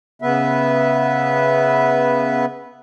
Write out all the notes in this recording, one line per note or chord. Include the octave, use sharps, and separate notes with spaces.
C#3 B3 B4 E5